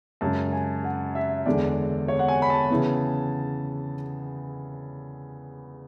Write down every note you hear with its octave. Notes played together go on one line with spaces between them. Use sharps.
F#2 C#3 G#3 A5
G#5
F#5
E5
E2 D3 G#3 D4 D5
C#5
F#5
G#5
B5
A5
C#3 E3 B3